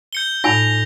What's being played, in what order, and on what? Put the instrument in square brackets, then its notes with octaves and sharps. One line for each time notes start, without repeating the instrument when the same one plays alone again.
[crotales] G6 C#7 G7
[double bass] A2 [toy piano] D#4 F4 G#5 [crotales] A#6 F7